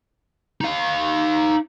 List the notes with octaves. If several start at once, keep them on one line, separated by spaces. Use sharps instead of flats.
D#4 F5